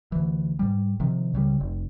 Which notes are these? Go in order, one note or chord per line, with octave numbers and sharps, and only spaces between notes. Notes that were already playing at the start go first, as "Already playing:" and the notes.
D2 E3
G#2 G3
C3 D#3 F3
C#2 C#3 F#3 G3
F1